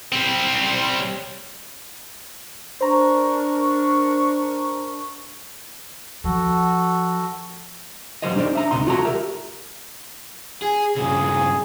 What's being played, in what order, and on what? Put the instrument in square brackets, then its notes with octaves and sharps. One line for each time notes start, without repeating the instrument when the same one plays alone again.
[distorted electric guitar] G3 C4
[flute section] D4 A#4 C#6 [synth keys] C5 A#5
[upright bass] F3 [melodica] F#4 A4
[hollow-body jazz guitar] C2 F#3 G3 C5 C#5 D#5
D4 D#4 G4 B4 C5 D5
D4 E5 A#5
C#2 G2 C3 D#4 C6
F4 F#4 A4 C#5 E5 A#5
G4 A#4 E5
[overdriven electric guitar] G#4
[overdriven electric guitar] G2 C#3 [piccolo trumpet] G#4